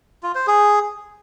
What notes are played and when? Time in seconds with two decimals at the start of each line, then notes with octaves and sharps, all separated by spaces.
0.23 F4
0.35 C5
0.47 G#4